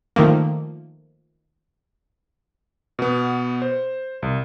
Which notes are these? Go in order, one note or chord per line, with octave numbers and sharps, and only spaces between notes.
D#3 F3 A3 A#3
B2 B3
C5
C2